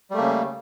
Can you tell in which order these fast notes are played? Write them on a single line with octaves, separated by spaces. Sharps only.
G3 A3 A#3 C#3